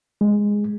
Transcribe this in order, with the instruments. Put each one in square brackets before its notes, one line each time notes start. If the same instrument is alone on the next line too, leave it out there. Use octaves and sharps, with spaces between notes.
[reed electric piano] G#3